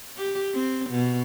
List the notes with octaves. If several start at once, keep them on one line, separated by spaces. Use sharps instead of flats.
G4
C4
B2